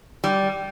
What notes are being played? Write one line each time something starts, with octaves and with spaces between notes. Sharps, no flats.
G3